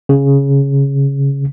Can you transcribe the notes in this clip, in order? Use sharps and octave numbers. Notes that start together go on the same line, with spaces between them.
C#3